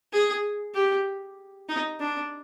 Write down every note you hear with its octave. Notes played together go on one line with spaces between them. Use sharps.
G#4
G4
D#4
D4